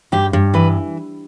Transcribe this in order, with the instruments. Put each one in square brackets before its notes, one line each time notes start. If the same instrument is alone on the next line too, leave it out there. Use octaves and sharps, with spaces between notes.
[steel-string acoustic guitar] G2 G4
G2
E3 B4